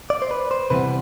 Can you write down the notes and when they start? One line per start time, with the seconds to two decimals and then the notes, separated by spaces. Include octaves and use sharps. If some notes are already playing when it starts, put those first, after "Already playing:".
0.10 D5
0.22 C5
0.31 B4
0.51 C5
0.70 C3 E3 G3 B3 B4